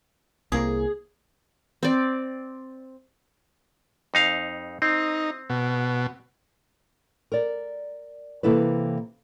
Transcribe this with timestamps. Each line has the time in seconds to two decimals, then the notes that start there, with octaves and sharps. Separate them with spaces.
0.52 C2 A#3 G#4
1.83 C4 D5
4.14 F2 D#4 F5
4.82 C4 D#4
5.50 B2
7.32 A#4 D5
8.43 C3 E3 A#3 E4 A4 B4